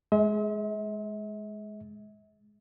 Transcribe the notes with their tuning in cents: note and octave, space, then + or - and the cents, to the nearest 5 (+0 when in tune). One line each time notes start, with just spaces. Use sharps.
G#3 +15 E5 -45